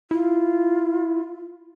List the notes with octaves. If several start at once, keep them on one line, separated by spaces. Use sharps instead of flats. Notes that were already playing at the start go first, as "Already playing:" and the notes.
E4 F4